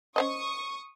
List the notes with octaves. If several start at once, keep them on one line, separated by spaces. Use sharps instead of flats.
C#4 C5 D#5 C#6 D#6